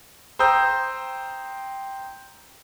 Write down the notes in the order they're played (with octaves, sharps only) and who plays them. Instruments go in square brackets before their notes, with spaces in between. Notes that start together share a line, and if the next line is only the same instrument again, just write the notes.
[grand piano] C5 G5 A#5 D#6 E6 G6